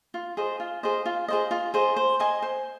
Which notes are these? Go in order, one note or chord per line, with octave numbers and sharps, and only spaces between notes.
F4
G#4 C5 D#5
F4
G#4 C5 D#5
F4
G#4 C5 D#5
F4
G#4 C5 D#5
C5
D#5 G#5 C6
C5